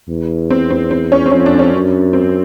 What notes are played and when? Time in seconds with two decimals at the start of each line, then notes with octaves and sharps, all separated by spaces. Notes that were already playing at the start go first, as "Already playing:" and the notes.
0.09 E2
0.50 C4
0.70 C4
0.91 C4
1.12 C#4
1.26 C4
1.31 F2 C#4
1.46 D4
1.59 C#4
1.72 F#2
2.13 C4